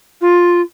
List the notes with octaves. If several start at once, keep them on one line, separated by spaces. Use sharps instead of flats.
F4